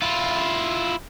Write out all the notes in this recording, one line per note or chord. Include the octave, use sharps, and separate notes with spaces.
E4 F4